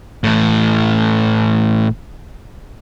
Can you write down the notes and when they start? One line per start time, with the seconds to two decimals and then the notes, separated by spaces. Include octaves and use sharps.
0.24 A2 E3